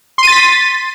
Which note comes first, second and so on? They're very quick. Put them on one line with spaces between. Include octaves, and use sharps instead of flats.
C6 D#7 A6 B6